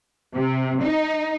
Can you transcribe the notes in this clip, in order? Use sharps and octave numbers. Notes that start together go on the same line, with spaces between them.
C3
D#4